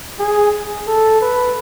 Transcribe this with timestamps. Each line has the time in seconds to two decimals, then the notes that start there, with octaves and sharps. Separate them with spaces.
0.19 G#4
0.87 A4
1.21 B4